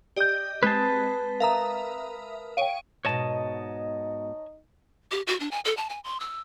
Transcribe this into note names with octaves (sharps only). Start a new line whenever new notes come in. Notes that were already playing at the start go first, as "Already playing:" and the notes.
G4 D5 D#5 G6
G#3 C4 B4 A5 F#6
A#4 E5 F5 A#5 D#6
C#5 F5 G5 D7 D#7
G#2 B2 D#4 C#5 D#5 A5
G4
F#4
D4
G#5
A4
A5
G#5
C6
E6